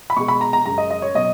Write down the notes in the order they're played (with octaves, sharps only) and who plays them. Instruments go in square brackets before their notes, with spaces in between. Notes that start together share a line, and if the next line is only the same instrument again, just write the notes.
[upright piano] B5
B2 G#3 C#6
B5
A#5
A#5
F#2 C#3 G#3 A#5
D#5
D#5
C#5
B2 F#3 D#5